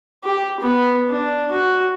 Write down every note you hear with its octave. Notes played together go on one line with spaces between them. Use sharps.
G4
B3
D4
F#4